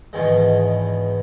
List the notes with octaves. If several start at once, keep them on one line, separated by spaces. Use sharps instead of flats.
E2 G#2 B2 D#3 G#3